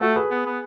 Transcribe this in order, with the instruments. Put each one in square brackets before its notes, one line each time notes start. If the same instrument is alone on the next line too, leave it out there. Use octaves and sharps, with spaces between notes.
[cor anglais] A3 [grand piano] F#4 A4
[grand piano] G#4 B4
[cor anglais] B3
B3